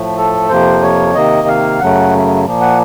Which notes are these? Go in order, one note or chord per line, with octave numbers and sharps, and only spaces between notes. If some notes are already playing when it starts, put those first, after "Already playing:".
Already playing: A2 F3 A3
A4
F2 C3 F3 A#3 C5
C#5
C3 D#3 A#3 D#5
F5
F#2 C#3 F#3 A3 F#5
A#2 F3 A#3
F#5